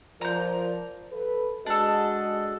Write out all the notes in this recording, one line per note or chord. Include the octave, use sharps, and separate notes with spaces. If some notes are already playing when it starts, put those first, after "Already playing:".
F3 A#4 D5 A#5 G6
A4 B4
G#3 D4 F#4 A4 D#5